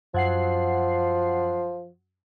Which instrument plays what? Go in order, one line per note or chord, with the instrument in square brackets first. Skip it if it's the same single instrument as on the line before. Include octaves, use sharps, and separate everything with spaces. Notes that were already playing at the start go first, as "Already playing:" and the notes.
[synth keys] F#2 F#5 C7 [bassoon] F3